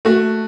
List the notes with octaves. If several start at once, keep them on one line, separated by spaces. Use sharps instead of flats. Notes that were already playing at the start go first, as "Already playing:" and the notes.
A3 F#4